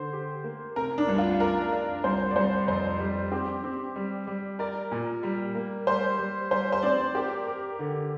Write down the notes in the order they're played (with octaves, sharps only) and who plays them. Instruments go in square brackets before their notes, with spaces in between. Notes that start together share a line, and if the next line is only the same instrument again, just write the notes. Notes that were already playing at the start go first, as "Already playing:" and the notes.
Already playing: [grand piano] D3 [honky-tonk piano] C5
[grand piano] G4
A#3
[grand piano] C3 [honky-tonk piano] A#4
[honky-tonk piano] D4
[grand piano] C2
[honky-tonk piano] F4
[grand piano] D4 [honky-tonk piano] A#4
[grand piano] D4
[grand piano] C2 [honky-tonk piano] C5
[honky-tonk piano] D5
[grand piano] C2 [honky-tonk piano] C5
[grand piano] F2 [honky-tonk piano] C5
[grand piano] G3
[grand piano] C4 [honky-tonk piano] G4
[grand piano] C4
G3
G3
[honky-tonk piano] A#4 [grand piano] D5
[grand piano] A#2
G3
A#3
[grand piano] G3 [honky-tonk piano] C5
[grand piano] G3
[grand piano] G3 [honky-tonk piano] C5
[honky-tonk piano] C5
[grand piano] C4 [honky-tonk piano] D5
[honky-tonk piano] G4 [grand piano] A#4
[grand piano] A#4
D3